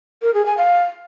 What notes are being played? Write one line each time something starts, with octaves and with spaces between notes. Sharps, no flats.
A#4
G#4
G#5
F5